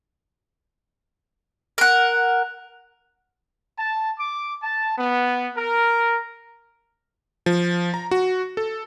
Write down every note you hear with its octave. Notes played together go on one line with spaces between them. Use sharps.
A#4 F#5
A5
D6
A5
B3
A#4
F3
A#5
F#4
A4